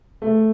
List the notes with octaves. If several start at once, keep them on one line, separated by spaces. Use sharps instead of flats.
A3